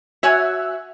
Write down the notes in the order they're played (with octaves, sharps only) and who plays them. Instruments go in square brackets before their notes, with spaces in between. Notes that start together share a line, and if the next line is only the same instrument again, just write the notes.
[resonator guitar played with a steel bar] F#4 C#5 G#5 [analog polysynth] E5 E6 F#6